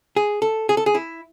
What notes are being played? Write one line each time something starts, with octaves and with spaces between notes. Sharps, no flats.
G#4
A4
G#4
A4
G#4
E4